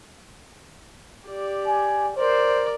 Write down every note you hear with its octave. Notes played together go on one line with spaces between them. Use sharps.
G4 D5
G#5
A#4 C5 D5